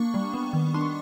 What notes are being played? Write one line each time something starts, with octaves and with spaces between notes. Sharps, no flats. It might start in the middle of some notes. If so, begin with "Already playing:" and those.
Already playing: A#3 D4 C#6
G3
B3
D#3
D4 C6
C#6